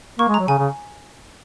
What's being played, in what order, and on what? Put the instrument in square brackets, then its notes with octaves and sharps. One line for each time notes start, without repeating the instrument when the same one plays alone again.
[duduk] A#3 [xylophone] C#6
[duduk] G#3
[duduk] F#3 [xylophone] A#5
[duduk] C#3 [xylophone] G#5
[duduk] C#3